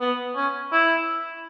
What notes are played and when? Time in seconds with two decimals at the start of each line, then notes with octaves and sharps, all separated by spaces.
0.01 B3
0.36 C#4
0.72 E4